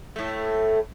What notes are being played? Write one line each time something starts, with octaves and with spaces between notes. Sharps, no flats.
A2 A3